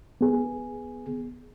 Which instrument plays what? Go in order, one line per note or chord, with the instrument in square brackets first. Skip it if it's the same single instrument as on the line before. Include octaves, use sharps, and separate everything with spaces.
[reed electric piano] B3 G#4